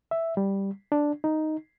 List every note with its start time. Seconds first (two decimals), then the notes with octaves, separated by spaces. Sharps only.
0.11 E5
0.37 G3
0.92 D4
1.24 D#4